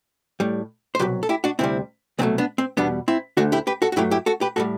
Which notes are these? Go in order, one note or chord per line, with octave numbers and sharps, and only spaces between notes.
A2 G3
C5
C2 B2 F#3 G4 B4
A4
E4 G4
D4 F#4
D2 C3 G3 C4 E4
C2 B2 F#3 A3 C4
B3 D4
C4
E2 B2 G3 B3 D4
C4 E4
D2 D3 A3 D4 F#4
E4 G4
G4 B4
F#4 A4
F#4
G2 F#3 A3 E4 G4
E4 G4
F#4 A4
G4 B4
A2 G3 F#4 A4